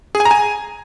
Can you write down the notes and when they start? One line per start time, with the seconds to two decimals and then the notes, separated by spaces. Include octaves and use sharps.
0.15 G#4
0.20 G#5
0.25 A#5
0.31 G#5